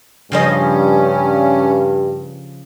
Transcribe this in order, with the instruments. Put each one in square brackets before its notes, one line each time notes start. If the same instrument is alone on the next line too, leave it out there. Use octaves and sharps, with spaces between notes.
[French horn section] G2 [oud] C#3 F3 D#5 [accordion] C#4